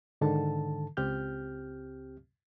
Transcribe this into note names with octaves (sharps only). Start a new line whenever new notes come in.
G#2 D3 D#3 A4 A5
C#2 C4 G4 F6 G6